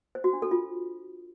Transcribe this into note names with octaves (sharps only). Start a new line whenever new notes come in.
C5
F#4
D4
A4
F4